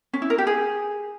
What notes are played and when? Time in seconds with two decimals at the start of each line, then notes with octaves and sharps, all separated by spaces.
0.13 C#4
0.22 E4
0.30 A#4
0.38 G4
0.47 G#4